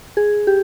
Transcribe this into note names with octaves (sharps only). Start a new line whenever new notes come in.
G#4
G4